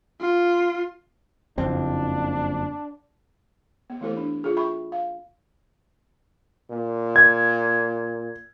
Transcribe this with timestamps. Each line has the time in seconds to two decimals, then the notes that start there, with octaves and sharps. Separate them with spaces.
0.21 F4
1.58 F#1 F2 C4 D4
3.90 B3
4.01 E3 A3 E4 G4 A4 C5
4.17 D4
4.43 F4 G#4 A4
4.56 E5 G5 B5 C#6
4.92 F5
6.70 A#2
7.16 G#6